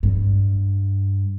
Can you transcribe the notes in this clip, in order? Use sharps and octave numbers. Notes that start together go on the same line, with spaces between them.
G2